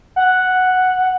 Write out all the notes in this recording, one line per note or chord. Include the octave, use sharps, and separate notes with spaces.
F#5